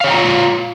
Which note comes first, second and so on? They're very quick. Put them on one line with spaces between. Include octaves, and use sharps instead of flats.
F5 C#5 G5 A#5 F4